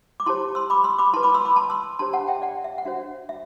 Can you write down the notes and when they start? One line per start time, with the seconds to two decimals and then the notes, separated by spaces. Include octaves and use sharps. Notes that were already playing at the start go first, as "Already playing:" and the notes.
0.20 D6
0.26 E4 G4 C5 A5 C6
0.55 C6 E6
0.70 B5 D6
0.84 C6 E6
0.98 B5 D6
1.13 E4 B4 A5 C6
1.23 B5 D6
1.34 C6 E6
1.45 B5 D6
1.56 A5 C6
1.70 C6 E6
1.99 D4 G4 C5 A5 C6
2.13 F#5 A5
2.27 E5 G5
2.42 D5 F#5
2.64 E5
2.78 F#5
2.85 D4 F#4 C5 E5
3.29 E5